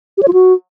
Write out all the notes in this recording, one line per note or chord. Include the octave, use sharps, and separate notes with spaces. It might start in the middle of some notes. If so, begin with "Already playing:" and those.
G4
C#5
F4
F#4